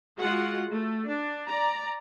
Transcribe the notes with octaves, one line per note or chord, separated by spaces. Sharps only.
G#3 F4 F#4 G#4 F#5
A3
D4
D5 A#5